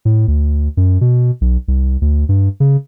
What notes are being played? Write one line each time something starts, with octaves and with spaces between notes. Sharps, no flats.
A2
D2
F#2
B2
B1
C2
D2
G2
C#3